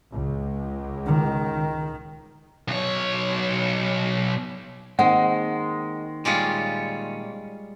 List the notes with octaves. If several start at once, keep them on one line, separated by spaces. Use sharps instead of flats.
C#2 G#3
D#3
B1 C#5
D#3 G#3 A#3 C4 F#5
A#2 G3 G#3 C#4 F4